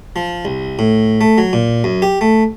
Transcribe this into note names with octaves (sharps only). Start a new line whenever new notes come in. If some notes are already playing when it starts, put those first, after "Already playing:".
F3
C2
A2
A3
F#3
A#2
F#2
G4
A3